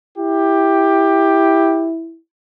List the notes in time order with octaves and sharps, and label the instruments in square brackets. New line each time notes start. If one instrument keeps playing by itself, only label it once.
[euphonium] E4 [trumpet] G4